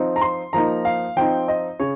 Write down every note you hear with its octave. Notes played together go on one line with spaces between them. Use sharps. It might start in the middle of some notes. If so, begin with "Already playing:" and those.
Already playing: F3 C4 D#4
A#5
C6
F3 A#3 D#4 A#5
F5
F3 C4 D#4 G5
D#5
C#3 C#5